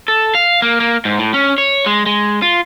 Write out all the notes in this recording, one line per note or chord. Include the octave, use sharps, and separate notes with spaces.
A4
F5
A#3
A#3
G#2
A2
C#4
C#5
G#3
G#3
F4